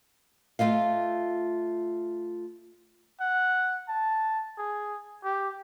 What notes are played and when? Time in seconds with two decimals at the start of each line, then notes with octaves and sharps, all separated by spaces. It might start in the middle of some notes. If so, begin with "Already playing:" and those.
0.59 A3 F4 D#5 F5
3.20 F#5
3.89 A5
4.58 G#4
5.24 G4